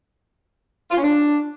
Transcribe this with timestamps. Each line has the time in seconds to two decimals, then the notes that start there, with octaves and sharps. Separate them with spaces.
0.91 F4
0.97 C#4
1.03 D4